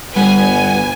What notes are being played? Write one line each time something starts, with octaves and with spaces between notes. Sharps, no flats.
G1 G3 B3 G#5